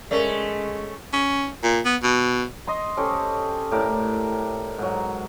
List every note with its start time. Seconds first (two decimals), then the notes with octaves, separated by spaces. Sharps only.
0.11 G#3 A3 C#4 A#4 D5
1.13 C#4
1.63 A#2
1.85 B3
2.03 B2
2.67 D#5 C6
2.97 C#4 G4 A4 C5
3.72 A2 G4 A#4 D5
4.78 G#2 F#3